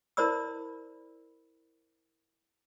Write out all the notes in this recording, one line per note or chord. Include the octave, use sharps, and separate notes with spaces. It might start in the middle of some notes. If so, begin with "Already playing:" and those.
E4 A#4 C5 D5 B5 E6